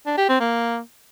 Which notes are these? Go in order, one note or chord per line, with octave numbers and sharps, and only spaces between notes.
D4
G4
C4
A#3